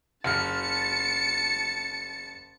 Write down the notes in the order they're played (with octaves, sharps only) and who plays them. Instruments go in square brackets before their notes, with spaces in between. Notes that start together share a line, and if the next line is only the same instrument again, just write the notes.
[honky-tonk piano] F#1 F6 [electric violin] A5 C#7